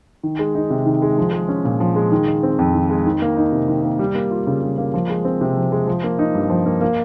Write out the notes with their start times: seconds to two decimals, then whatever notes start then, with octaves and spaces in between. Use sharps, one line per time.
0.23 D#3
0.39 G#3
0.55 D#4
0.70 C3
0.86 D#3
1.02 G#3
1.18 F3
1.33 G#3
1.49 C#4
1.65 A#2
1.80 F3
1.96 G#3
2.12 D#3
2.28 G#3
2.43 C4
2.59 F2
2.74 D#3
2.90 G#3
3.06 D#3
3.22 A#3
3.37 D#4
3.52 C3
3.68 D#3
3.84 A#3
3.99 G3
4.15 A#3
4.31 F4
4.47 C#3
4.62 G3
4.78 A#3
4.94 F3
5.09 G#3
5.25 C4
5.41 C3
5.57 F3
5.72 G#3
5.87 F3
6.04 A#3
6.19 D#4
6.35 G2
6.50 F3
6.66 A#3
6.81 A#3